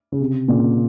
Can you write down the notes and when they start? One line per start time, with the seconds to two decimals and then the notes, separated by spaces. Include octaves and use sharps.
0.12 C#3
0.20 C3
0.48 A#2 C#3